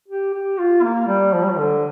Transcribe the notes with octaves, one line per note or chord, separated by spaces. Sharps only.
G4
G4
F4
A#3
G3
F3
G3
F3
D3